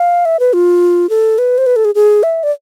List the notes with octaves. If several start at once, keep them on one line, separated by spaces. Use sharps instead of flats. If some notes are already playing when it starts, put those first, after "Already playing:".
Already playing: F5
E5
B4
F4
A4
B4
C5
B4
A4
G#4
G#4
E5
D5